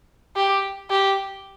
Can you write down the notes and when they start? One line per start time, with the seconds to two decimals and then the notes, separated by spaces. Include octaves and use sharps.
0.36 G4
0.90 G4